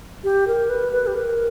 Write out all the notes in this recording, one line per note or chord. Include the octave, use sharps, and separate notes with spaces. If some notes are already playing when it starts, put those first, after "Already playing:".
G4
A#4
B4
B4
G4
A#4